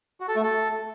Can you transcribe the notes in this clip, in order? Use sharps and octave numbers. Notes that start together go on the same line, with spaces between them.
F#4
A4
A3
A4